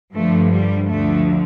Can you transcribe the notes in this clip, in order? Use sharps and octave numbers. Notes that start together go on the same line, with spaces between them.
G2 D3 F3 A3
G3
D2 D3 F3 A3